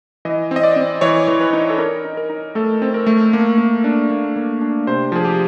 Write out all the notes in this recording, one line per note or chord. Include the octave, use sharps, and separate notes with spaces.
E3 D#5
C4
D#5
D5
C4
E3 C#5
E3
B4
D#4
A4
D#4 A#4
D#4
A#4
D#4
A3 A4
C4
A#4
A3
A#3
A#3
D4
A#3
A#3
D4
C3 C5
F3 G#4
G4